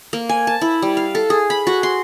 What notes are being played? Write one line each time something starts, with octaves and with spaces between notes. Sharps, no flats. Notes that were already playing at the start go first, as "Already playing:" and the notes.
A#3
G#5
A5
E4
G3
F5
A4
G#4
B5
F#4
C6